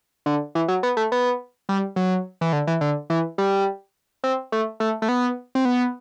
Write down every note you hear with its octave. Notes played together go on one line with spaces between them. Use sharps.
D3
E3
F#3
B3
A3
B3
G3
F#3
E3
D3
E3
D3
E3
G3
C4
A3
A3
A3
B3
C4
B3